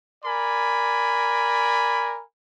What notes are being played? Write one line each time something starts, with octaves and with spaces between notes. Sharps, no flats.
A#4 D5 G#5 B5